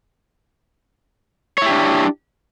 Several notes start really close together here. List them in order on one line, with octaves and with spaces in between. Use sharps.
C#5 E4 G4 D4